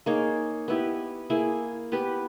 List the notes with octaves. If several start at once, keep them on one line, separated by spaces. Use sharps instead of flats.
A#3 D#4 G#4 C#5
B3 E4 G4
A#3 E4 G#4
B3 G4 B4